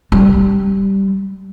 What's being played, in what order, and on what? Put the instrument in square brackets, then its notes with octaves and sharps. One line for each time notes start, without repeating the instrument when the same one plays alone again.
[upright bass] G3